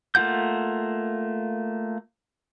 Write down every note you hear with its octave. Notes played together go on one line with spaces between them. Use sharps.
A3 A#3 F4 F#5 G6